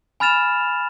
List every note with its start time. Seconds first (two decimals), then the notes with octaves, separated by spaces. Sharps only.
0.20 G#5 B5 F6 A6 E7 F7